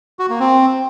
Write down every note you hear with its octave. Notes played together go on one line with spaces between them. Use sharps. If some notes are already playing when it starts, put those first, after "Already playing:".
F#4
A#3
C4